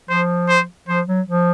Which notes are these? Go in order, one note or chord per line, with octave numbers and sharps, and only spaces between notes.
F3 C5
C5
F3 C5
F#3
F3